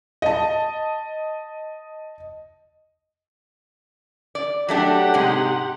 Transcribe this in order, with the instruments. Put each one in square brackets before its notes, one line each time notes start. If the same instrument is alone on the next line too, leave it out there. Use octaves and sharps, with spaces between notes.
[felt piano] D#5 A5
[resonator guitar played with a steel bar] D5
[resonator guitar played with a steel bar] F#3 A3 D4 [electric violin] G4 F#5
[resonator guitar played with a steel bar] G#2 C3 G#3